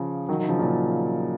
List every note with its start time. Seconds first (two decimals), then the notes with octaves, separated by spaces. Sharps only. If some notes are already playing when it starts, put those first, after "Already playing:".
Already playing: C#3 F3
0.29 D#3 F#3
0.39 D#3 F#3
0.49 C#3 F3
0.59 A#2 C#3